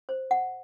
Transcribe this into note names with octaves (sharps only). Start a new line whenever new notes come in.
C5
F#5